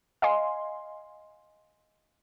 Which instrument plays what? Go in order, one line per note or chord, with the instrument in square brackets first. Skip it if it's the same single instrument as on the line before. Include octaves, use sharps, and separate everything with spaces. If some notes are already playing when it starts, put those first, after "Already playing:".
[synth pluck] D#5 F5 G#5 C6